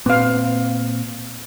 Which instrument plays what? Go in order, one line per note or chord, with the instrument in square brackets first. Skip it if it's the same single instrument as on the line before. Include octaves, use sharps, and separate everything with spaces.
[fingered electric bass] A#2 C4 [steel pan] B3 F5